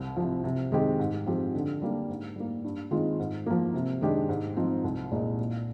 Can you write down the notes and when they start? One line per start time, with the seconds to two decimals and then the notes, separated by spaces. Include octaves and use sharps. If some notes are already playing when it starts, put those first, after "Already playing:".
Already playing: C2
0.16 C3 F3
0.44 C3
0.72 D#3 G#3 C4 G4
0.99 G#2
1.26 F3 C4 G4
1.55 D3
1.82 G3 A#3 D4
2.09 G#2
2.36 G3 A#3
2.64 G2
2.91 D#3 G#3 C4 F4
3.19 G#2
3.46 F3 A#3
3.74 C3
4.01 D#3 G#3 D4 G4
4.29 G#2
4.57 F3 C4 D#4
4.84 C2
5.11 A#2 G#3 D#4
5.39 A#2